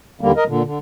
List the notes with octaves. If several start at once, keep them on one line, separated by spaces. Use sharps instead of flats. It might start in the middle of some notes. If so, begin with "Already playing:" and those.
D#2 D3 G3 A#3
A#4 D#5
A#2 D3
D3